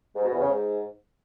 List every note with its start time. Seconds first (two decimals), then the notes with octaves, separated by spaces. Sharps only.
0.16 G#2
0.24 B2
0.32 E2
0.40 C#3
0.49 G#2